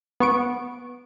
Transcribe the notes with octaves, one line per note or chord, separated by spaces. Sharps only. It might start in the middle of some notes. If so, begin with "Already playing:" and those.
B3 C#6 D7